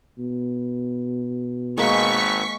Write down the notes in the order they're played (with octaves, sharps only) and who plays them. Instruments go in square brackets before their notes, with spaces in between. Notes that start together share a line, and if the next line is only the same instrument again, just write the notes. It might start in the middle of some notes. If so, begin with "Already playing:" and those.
[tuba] B2
[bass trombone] G#1 [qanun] G#3 A#3 B4 [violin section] C#6 B6